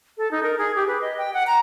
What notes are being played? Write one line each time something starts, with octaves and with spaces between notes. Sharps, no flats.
A4
D#4
A#4
G#4
G4
B4
D#5
G5
F#5
A#5